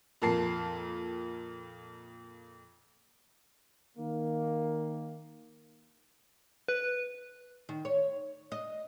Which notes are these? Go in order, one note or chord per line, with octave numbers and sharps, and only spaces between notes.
F2 A#2 F4 A#4 A5 C7
D#3 A#3
B4
D#3
C#5
D#5